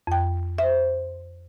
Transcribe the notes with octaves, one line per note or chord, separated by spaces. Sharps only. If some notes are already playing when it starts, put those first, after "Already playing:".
F2 G5
C5 E5